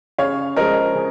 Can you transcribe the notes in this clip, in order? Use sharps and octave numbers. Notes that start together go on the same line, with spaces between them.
C#3 C#5 F5
F3 G#3 A#4 D#5
C#3